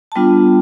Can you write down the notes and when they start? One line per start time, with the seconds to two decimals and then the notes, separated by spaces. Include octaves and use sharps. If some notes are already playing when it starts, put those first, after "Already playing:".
0.12 A5
0.15 G3 B3 D4 F4 G5